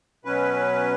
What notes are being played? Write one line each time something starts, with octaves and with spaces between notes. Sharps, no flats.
B2 F#3 C#4 B4